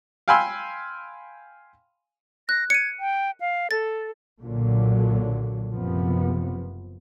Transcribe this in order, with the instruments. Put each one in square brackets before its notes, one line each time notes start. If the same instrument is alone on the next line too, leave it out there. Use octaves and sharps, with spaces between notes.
[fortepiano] F5 G5 G#5 B5 C6 E6
[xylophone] F#6 [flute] A#6
[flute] G#6 [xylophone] C#7 D#7
[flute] G5
F5
[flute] A4 [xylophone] A6
[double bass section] B1 A#2 D3 F#3
F#1 C3 F3 B3